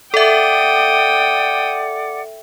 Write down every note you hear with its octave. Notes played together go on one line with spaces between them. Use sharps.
A4 D5 E5 F#5 G5 D6 D#6